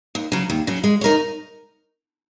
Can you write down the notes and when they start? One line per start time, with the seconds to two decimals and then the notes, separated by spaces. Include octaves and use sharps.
0.15 D#2
0.32 C#3 F#3
0.50 D#2
0.67 C#3 F#3
0.84 G#3
1.01 D#4 A#4 C#5